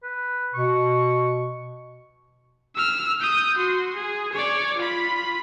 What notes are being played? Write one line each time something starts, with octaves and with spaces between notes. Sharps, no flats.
B4
B2 C#6
E6 F6
D#6 G6
F#4 C6
G#4
C#5 D5
F4 B5